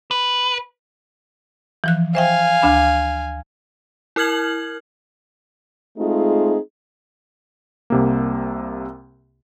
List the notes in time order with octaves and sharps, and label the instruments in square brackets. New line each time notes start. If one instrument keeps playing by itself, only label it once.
[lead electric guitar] B4
[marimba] E3 F3 F#6
[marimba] C5 E5 G5 [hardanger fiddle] F5 G#5
[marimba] D2 D4 B5
[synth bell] E4 A#4 F6 G#6 F#7
[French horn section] G#3 A3 C4 D#4 F4 G#4
[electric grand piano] C2 C3 A#3